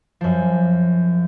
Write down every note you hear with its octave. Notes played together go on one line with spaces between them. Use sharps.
F#2 F3